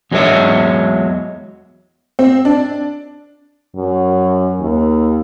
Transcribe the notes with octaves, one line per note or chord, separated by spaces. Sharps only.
E2 F#3 G#3 B3 C#5 E5
C4
D4
F#2
D#2